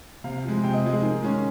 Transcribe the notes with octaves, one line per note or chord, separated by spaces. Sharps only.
C3 F5
F3 G#3
C3 G5
D#5
F3 G#3
G#4
D#3
G#3 C#4